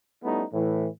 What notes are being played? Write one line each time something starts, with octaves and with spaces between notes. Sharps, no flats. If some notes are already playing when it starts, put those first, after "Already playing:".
G3 A3 B3 C#4 D#4 E4
A2 E3